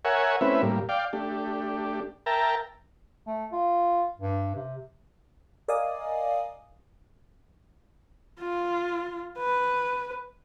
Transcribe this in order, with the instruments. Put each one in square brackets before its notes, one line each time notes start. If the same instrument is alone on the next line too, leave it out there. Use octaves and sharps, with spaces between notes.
[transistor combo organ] A#4 C#5 E5 F#5 G#5
A3 C4 C#4 E4 B4 E5
A2 G3 A#3
D5 F5 G5
A3 D4 G4
A#4 E5 G5 A5 A#5
[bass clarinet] A3
F4
G2
C3
[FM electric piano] A#4 D5 D#5 F5 G#5 D#6
[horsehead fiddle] F4
B4